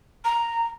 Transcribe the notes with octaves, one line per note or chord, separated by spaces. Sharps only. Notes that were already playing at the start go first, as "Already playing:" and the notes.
A#5